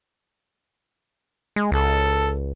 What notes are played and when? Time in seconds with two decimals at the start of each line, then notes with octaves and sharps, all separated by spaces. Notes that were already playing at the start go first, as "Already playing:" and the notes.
1.56 G#3
1.72 C#2 A4